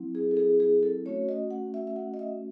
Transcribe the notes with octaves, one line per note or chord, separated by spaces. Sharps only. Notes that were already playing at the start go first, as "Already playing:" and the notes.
Already playing: F#3 C4 E4
G#4
A4
G#4
G#4
A4
A3 C#4 F#4 C#5
D#5
F#5
E5
E5
F#5
D#5
E5